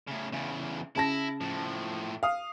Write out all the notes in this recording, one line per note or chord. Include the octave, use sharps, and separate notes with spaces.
A2 C#3
E2 C#3
C#3 E4 A5 A#6
A2 F3
F5 D#6